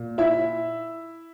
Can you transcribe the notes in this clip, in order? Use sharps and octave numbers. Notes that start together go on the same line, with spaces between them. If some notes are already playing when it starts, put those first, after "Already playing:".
Already playing: A#2
E4 E5